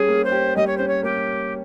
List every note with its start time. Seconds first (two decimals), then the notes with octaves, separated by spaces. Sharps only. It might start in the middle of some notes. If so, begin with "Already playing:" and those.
Already playing: G3 C#4 G#4
0.08 A#3
0.24 C5
0.32 G4
0.56 G3 D#5
0.67 C#5
0.78 C#4 C5
0.88 C#5
1.03 A#3 G4